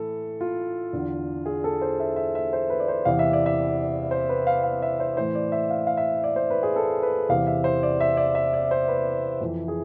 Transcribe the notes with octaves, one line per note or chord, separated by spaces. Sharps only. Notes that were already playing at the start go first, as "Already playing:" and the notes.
Already playing: A2 E3 A4
F4
E2 D3
G#4
A4
C5
E5
E5
E5
C5
B4
D5
C5
E2 C3 E3 F5
E5
D5
E5
C5
B4
F5
F5
E5
C5
A2 E3 C5
D5
E5
F5
F5
E5
D5
C5
B4
G#4
A4
B4
E2 C3 E3 F5
E5
C5
D5
E5
D5
E5
D5
C5
B4
F2 E3
G#4